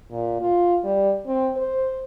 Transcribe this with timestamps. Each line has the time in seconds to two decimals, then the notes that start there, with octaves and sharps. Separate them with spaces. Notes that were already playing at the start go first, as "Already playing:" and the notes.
0.11 A#2
0.41 F4
0.84 G3
1.27 C4
1.57 C5